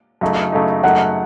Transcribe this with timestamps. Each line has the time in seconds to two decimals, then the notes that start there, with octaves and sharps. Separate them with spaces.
0.21 F#2 C#3 A3 D#4
0.52 F#2 C#3 A3 D#4
0.84 F#2 C#3 A3 D#4 F#5